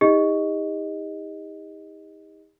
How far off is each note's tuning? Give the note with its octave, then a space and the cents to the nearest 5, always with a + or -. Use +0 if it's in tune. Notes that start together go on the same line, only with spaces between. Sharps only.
D#4 +40 G4 +45 D#5 +0